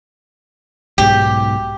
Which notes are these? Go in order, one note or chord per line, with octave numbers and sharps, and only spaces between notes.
B1 G#2 B2 G4